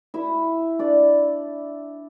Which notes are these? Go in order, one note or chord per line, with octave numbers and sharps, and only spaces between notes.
E4 E5
D4 D5